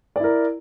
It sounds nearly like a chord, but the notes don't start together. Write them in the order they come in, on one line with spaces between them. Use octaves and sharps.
D5 E4 A#4